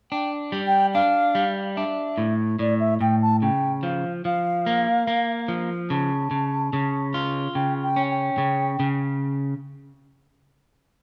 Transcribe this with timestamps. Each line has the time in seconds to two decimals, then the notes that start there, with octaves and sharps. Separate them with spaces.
0.11 D4 G5
0.52 G3
0.67 G5
0.94 D4 F5
1.35 G3
1.76 D4 E5
2.18 A2
2.59 A2 D5
2.80 E5
3.01 A2 G5
3.22 A5
3.42 C#3 G5
3.83 F3 F5
4.25 F3 F5
4.66 A#3
5.07 A#3
5.48 F3
5.90 C#3 A5
6.31 C#3
6.73 C#3
7.14 F4
7.55 C#3 G5
7.83 G5
7.96 C#4
8.10 G5
8.38 C#3
8.80 C#3